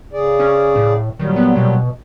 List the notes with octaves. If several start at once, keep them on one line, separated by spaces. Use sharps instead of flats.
C#3 G#4 D5
C#4
A2
A#2 D#3 F#3 G3
B3
B2